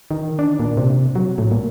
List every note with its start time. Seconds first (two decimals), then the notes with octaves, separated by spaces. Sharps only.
0.11 D#3
0.39 D4
0.60 A#2
0.77 C3
1.15 F#3
1.38 A2
1.51 A#2